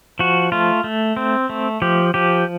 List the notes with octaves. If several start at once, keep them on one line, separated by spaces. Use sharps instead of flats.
F3 F#4
A3 F4
A3
C4
A3
F3 G4
F3 G4